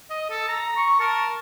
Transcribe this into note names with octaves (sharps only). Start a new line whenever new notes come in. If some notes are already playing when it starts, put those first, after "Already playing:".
D#5
A4
A#5
C#6
A#4 A5